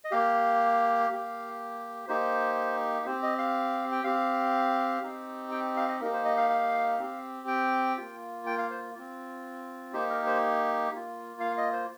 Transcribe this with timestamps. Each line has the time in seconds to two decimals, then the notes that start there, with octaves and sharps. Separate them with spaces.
0.04 D#5
0.11 A#3 G4 F5
1.10 A#3 G4
2.08 A#3 D#4 G4 C5
3.06 C4 G4 C5
3.23 D#5
3.38 F5
3.92 G5
4.04 C4 G4 F5
5.02 C4 D#4 G4
5.51 G5
5.77 F5
5.88 D#5
6.01 A#3 D#4 G4 A#4
6.13 C5
6.25 D#5
6.37 F5
6.50 F5
6.99 C4 G4
7.48 G5
7.97 A#3 F4
8.46 G5
8.58 F5
8.70 C5
8.95 C4 F4
9.93 A#3 D#4 G4 C5
10.10 A#4
10.26 C5
10.92 A#3 F4
11.40 F5
11.57 D#5
11.73 C5